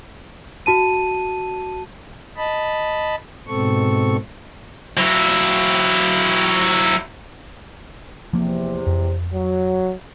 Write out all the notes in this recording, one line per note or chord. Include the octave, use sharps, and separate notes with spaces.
F#4 A5 D#7
D#5 A5 B5
G#2 B2 C4 A4 C#6
F#3 E4
E2 C3 F3 A#3
F2
F#3